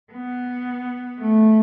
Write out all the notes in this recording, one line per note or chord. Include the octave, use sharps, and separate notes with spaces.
B3
A3